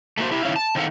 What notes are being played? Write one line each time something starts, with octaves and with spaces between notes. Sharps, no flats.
A3 A#3 F#4 C5
E4 G4
D#3 E3 C#4 E4 F5
A5
E2 D#3 C4 A4 F5 F#5